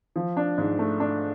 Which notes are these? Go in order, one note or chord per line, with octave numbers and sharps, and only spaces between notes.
F3
D4
G#2
A3
D4